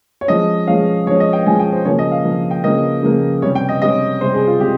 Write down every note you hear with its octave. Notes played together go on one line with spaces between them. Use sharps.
C#5
F3 G#3 C#4 D#5
F3 G#3 C#4 F5
F3 G#3 C#4 C#5
D#5
G5
F3 G#3 C#4 G#5
G5
C5
C#3 F3 A#3 C#5
D#5
F5
C#3 F3 A#3
G5
C#3 F3 A#3 D#5
C#3 F3 A#3
C3 G3 C#4 C#5
G5
D#5
C3 G3 C#4 D#5
C3 G3 C#4 C5
G#4
F4
C3 G4